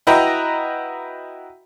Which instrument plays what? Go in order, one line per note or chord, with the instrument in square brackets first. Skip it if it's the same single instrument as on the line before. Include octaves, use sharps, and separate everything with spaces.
[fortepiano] E4 F#4 B4 D#5 G5 A#5